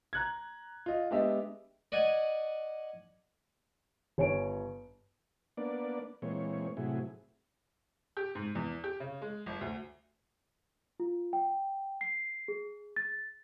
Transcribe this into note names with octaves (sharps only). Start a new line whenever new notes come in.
A#5 F#6 G#6
F4 D#5
G#3 B3 D4 G4 D#5 E5
D5 D#5 F#5 G#5
G1 C#5 G#5 D7
A#3 B3 D4 D5
A#2 E3 G#3 C4 C#5
A2 C3 F#3 E4 G#4
G4
G#2
E2
G4
C#3
G#3
G1
D2
F4
G5
C7
G#4
A6